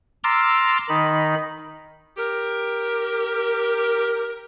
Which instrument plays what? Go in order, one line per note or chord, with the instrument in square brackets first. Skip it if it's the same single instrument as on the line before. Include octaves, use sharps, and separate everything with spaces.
[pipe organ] A#5 C6 D6 E6 F6 A6
D#3 D#4 B5
[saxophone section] G4 A#4